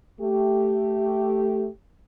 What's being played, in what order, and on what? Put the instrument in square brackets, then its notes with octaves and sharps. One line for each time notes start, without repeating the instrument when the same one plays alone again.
[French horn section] A3 G4